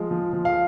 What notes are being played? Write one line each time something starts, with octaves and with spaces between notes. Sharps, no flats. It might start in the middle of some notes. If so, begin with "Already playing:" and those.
Already playing: F3 G#3
F3
F3
F5